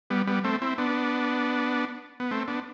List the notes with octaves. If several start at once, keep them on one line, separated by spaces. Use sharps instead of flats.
G3 B3
G3 B3
A3 C4
C4 E4
B3 D4
B3
A3 C4
B3 D4